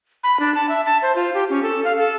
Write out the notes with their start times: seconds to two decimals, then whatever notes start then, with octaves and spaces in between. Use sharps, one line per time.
0.23 B5
0.39 D4
0.55 A5
0.69 E5
0.86 A5
1.02 C5
1.15 F4
1.34 G4
1.50 C#4
1.62 A4
1.84 F5
1.98 A4